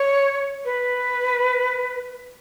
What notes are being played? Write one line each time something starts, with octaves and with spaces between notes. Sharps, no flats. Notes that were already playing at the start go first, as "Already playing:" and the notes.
Already playing: C#5
B4